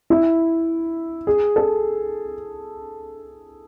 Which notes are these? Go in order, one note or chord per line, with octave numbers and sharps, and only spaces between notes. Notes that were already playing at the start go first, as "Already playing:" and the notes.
E4
G#4
A4